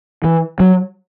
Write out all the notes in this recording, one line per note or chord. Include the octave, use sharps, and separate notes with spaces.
E3
F#3